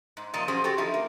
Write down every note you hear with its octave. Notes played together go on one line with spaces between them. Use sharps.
G#2
A#2 F3 A#3 D#5 A5
F3 F#3 C#4 F#4 G#4 C5
C4 F#4 G4 A4
F3 D#4 E4
A#3